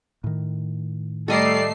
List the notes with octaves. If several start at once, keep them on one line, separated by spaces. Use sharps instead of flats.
A2 D#3
G3 A3 A4 D5 D#5 A#5 C7